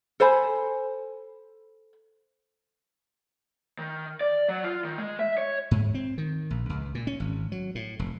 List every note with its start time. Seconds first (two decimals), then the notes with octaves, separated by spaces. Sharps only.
0.20 A4 C5 G#5 B5
3.79 D#3
4.21 D5
4.49 F#3
4.64 F4
4.84 D#3
4.98 G#3
5.19 E5
5.38 C#5
5.71 G#2
5.94 C4
6.18 D#3
6.50 A#1
6.70 C#2
6.95 A#2
7.07 C#4
7.20 G#1
7.52 F#3
7.75 A2
7.99 F1